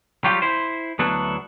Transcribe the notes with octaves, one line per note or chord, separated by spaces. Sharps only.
F#3 G3 F4 G4
E4 C5
D2 F#3 B3 D4 E4 A4